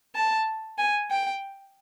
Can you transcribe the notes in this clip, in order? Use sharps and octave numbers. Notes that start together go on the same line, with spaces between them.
A5
G#5
G5